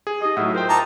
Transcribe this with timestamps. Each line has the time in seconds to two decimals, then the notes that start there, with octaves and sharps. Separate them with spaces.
0.07 G#4
0.22 D#4 G4 D#5
0.37 A2 F#3 E5 F#5 D#6 F6
0.55 F4 A#4 C5 G5 C6
0.69 D#4 A5 A#5 D6